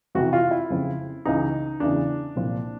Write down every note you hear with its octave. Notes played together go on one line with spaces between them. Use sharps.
F2 C3 E3 F#4
F4
E4
F2 C#3 F3
C#2 C#3 E3 D#4
E2 C#3 E3 D4
C2 A#2 F3